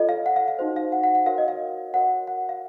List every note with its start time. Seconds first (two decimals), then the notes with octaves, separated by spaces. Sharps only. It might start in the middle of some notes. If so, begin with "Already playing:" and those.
Already playing: F4 A4 C#5 D#5
0.09 F5
0.26 F#5
0.36 F5
0.48 F5
0.59 D#4 F#4 C5
0.76 F5
0.92 F#5
1.03 F#5
1.15 F#5
1.26 F#4 A#4 C#5 F5
1.38 D#5
1.48 F5
1.93 F#4 A#4 C#5 F#5
2.27 F#5
2.49 F5